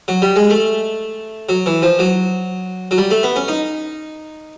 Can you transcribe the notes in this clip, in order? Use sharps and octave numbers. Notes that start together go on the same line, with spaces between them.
F#3
G3
G#3
A3
F#3
E3
F3
F#3
F#3
G3
A3
B3
C#4
D#4